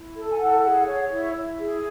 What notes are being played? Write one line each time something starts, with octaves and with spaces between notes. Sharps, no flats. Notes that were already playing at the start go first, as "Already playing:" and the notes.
Already playing: E4
A4
G#5
E4 F#5
G#4
C#5
E4
E4
G#4